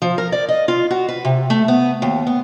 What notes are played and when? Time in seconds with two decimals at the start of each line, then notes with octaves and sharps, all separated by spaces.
0.02 F3
0.18 A#4
0.32 D5
0.48 D#5
0.68 F4
0.91 F#4
1.09 B4
1.25 C3
1.50 A3
1.68 B3
2.02 D#2
2.27 B3